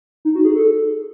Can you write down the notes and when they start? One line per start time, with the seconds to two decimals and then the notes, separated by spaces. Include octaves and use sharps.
0.25 D#4
0.35 F#4
0.45 G#4
0.55 A4